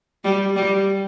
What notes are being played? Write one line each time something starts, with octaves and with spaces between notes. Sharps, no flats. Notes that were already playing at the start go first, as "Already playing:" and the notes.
G3
G3